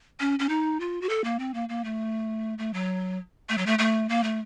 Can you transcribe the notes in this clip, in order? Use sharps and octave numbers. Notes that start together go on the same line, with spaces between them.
C#4
C#4
D#4
F4
F#4
A4
A#3
C4
A#3
A#3
A3
A3
F#3
A3
F#3
A3
A3
A#3
A3